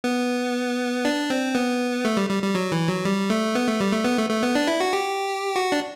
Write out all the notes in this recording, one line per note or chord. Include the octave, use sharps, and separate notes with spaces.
B3
D4
C4
B3
A3
G3
G3
G3
F#3
E3
F#3
G3
A3
B3
A3
G3
A3
B3
A3
A3
B3
D4
E4
F#4
G4
F#4
D4